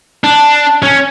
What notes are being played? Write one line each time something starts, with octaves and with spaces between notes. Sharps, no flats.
D4
C#4